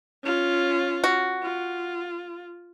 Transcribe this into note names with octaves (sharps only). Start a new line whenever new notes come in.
C#4 F4
F#4
F4